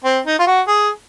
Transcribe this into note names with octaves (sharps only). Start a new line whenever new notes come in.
C4
D#4
F4
F#4
G#4